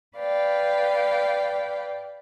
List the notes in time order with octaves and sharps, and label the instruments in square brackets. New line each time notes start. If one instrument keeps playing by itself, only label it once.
[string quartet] B4 D5 F5 G5